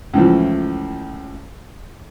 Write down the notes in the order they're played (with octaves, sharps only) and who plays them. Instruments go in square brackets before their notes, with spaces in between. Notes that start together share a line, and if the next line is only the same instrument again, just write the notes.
[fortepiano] C#2 A2 E3 F3